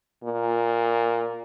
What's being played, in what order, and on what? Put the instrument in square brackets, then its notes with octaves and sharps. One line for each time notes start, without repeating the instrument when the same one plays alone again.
[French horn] A#2